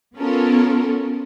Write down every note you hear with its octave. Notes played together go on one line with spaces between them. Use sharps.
B3 C#4 F4 A4 A#4